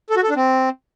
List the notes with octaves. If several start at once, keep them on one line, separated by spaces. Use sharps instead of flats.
A4
F#4
A4
D4
C4